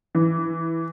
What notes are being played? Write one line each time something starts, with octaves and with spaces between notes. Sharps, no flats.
E3